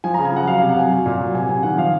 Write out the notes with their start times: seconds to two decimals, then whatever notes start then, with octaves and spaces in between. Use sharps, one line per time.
0.04 F3 G#5
0.14 A#5
0.19 C#3
0.25 G#5
0.32 F3 F#5
0.47 F#3 F5
0.58 F5
0.62 C3
0.69 F#5
0.76 F#3 G#5
0.91 F#3
1.06 A#2
1.20 F#3
1.34 C3 G#5
1.49 C3 G#5
1.63 D#3 F#5
1.77 F3 F5